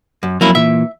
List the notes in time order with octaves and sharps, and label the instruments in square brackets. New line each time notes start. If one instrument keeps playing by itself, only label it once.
[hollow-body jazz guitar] F#2
[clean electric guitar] F2 F#3 [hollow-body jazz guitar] A#3 C#4 E4
[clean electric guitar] A#2 E3 [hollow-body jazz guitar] E5